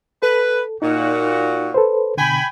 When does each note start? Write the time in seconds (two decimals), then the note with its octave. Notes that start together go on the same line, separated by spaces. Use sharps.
0.23 A4 B4
0.82 A#2 D#4 F#4
1.74 A4 B4 C5
2.17 B2 D3 G5 G#5 B5